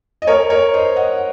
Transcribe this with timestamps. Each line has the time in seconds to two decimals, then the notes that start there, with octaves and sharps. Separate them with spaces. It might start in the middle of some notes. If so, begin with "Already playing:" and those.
0.22 D#5
0.27 A#4 C#5
0.50 A#4 C#5
0.74 C5 D#5
0.96 D#5 F#5